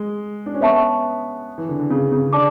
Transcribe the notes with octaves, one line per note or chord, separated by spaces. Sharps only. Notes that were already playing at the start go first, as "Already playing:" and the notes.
Already playing: G#3
D4
C#4
B3 C#5 E5 A5 C#6
E3
D3
D3
C#3
C#3
D3 D5 A5 D6